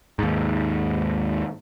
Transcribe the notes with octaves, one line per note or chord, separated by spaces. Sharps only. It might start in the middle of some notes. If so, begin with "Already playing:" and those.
D#2 G#2